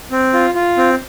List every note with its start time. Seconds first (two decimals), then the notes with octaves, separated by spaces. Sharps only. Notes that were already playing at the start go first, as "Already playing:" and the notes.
0.11 C4
0.33 F4
0.55 F4
0.78 C4